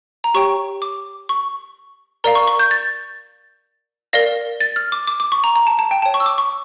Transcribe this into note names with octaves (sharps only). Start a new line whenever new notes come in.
A#5
G4 C#5 G5 C#6
D6
C#6
A#4 D5 F5 A#5
C#6
C#6
G6
A6
A#4 D5 F5 A#6
A6
F6
D6
D6
D6
C#6
A#5
A#5
A5
A5
G5
C#5 G5 A5
C#6
E6
D6
C#6